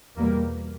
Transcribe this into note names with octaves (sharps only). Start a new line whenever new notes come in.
E2 B2 G3 A#3